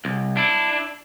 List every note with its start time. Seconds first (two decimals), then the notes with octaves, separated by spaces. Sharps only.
0.05 C2
0.37 D4 E4